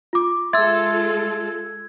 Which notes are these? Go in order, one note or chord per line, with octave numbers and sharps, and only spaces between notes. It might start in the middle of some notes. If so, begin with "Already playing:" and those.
F4 D6
G#3 F4 A4 E5 C6 E6 G#6 A6